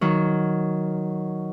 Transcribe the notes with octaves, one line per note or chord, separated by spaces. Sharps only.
D#3 F#3